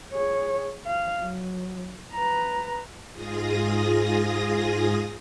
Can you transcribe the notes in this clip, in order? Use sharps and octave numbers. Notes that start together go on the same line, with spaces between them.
G#4 C#5
F5
F#3
B4 A#5
G#2 F4 G#4 D#6 A#6